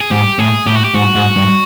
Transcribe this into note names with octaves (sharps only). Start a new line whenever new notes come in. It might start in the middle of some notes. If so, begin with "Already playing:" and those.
G#4
G#2 G4
A2 G#4
A2 G4
F#4
G4
G#2 F#4
G#2
G2